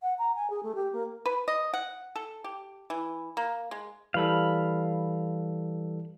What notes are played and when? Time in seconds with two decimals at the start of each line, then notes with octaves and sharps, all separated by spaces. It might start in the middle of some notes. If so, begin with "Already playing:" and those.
0.01 F#5
0.18 A#5
0.35 G#5
0.49 G#4
0.62 A3
0.74 G4
0.92 A#3
1.26 B4
1.48 D#5
1.74 F#5
2.16 A4
2.44 G4
2.90 E3
3.37 A#3
3.71 G#3
4.14 E3 G3 A4 F5 B5